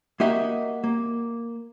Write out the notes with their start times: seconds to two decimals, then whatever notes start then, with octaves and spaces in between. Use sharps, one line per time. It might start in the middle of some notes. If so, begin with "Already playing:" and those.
0.20 A#3 F#4 G4 D#5 E5 F#5
0.84 A#3